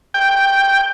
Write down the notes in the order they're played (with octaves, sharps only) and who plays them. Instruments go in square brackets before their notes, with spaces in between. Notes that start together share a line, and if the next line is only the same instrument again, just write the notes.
[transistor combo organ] G5